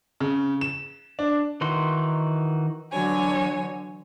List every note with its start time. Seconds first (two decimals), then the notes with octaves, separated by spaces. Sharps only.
0.21 C#3
0.61 E7
1.19 D4
1.61 D#3 E3 D#4 F#4 C6
2.92 D3 E3 F#3 F#4 C#5 G#5